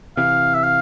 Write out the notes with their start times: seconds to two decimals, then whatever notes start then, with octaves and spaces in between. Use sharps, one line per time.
0.17 C3 E3 F5
0.55 E5
0.64 F5